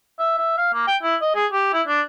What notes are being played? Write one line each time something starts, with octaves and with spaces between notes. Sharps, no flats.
E5
E5
F5
A#3
G5
E4
D#5
G#4
G4
E4
D4